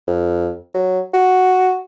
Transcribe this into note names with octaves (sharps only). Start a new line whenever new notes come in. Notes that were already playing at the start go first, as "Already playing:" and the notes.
F2
F#3
F#4